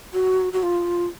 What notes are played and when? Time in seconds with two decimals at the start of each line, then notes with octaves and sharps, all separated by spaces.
0.13 F#4
0.53 F#4
0.63 F4